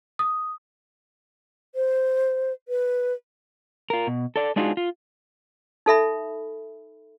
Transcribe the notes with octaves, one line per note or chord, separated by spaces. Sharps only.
D#6
C5
B4
F4 A#4
B2
A4 D5
G#3 D4 D#4 F4 F#4 G#4
F4
D#4 A4 E5 B5